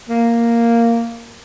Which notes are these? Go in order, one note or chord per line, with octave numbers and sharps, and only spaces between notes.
A#3